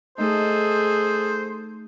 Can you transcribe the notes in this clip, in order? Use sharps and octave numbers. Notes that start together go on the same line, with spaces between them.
A3 D#4 G#4 A4 C5